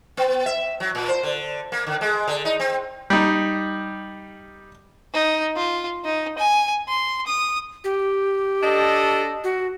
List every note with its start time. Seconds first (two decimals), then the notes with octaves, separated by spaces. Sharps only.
0.17 B3
0.46 E5
0.80 F#3
0.95 A#2
1.09 C5
1.23 D3
1.72 A#3
1.87 D3
2.01 G#3
2.28 D3
2.45 D#4
2.60 C4
3.10 G3 D#4
5.14 D#4
5.56 F4
6.04 D#4
6.38 G#5
6.88 C6
7.26 D#6
7.84 G4
8.63 D4 A4 D#5
9.44 F#4